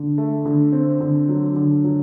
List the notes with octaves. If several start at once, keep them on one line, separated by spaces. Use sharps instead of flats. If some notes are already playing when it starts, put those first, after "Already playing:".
Already playing: D3
A3
D3
C4
D3
F#3
D3
F#3